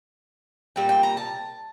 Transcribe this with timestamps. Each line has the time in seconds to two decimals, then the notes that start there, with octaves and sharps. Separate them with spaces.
0.76 A#2 G3 G5
0.89 G5
1.03 A#5
1.17 A5